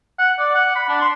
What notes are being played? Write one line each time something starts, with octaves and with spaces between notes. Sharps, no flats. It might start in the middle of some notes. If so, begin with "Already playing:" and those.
F#5
D5
F#5
B5
D4
C6